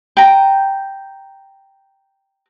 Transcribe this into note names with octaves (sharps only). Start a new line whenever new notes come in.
G5 A#5